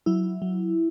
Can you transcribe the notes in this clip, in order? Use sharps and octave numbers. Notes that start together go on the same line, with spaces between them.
F#3 E4
F#3